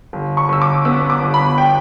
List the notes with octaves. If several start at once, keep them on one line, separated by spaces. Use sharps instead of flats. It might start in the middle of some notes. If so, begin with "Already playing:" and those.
G1
C#6
G1 E6
D6
B3 E6
D6
G1
B5
G5